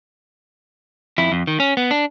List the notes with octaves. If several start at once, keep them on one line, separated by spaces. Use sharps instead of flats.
F2 E4
F2
D#3
C#4
B3
D4